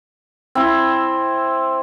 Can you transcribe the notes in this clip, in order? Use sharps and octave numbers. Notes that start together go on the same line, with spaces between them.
C4 E4